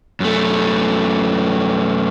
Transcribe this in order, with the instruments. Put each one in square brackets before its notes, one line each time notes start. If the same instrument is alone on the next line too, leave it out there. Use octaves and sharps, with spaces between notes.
[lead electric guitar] F#2 A3